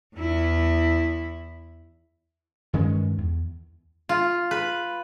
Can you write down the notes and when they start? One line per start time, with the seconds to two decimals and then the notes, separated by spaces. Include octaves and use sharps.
0.16 E2 E4
2.73 G2 D#3 G#3 C#4
3.18 E2
4.09 F4
4.51 B4